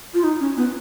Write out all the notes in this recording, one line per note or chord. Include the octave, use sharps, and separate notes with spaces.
F4
D#4
C#4
B3